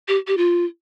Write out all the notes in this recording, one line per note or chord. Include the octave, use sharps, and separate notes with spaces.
G4
G4
F4